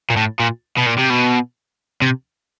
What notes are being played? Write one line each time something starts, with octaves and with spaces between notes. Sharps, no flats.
A#2
A2
A#2
B2
A#2
C3
B2
C3